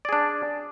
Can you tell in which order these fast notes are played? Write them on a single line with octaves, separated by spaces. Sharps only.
D5 G#4 D4